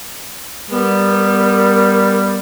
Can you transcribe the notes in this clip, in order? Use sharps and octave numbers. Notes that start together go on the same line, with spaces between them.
G3 B3 A#4